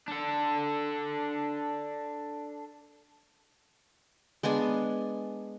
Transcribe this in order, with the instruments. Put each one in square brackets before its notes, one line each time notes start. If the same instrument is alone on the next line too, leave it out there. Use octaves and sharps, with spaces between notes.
[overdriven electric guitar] D4 A4
[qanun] G#3 B3 D4 G#5